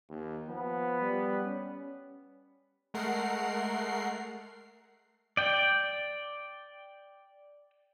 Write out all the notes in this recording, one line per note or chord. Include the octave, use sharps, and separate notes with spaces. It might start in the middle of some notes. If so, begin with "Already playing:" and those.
D#2
F3 B3
G3
C#4
G#3 A3 A#4 F#5 C7
D5 G5